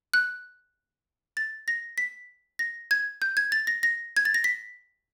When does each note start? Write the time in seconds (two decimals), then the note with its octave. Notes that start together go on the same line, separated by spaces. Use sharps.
0.14 F#6
1.37 A6
1.68 A#6
1.98 B6
2.59 A#6
2.91 G#6
3.22 G6
3.37 G#6
3.52 A6
3.67 A#6
3.83 A#6
4.17 G#6
4.25 A6
4.34 A#6
4.44 B6